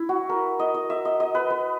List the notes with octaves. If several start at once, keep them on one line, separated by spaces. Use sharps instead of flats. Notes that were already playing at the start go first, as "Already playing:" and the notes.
Already playing: E4
F#4
A#4
D#5
D#5
E5
D#5
D#5
B4
B4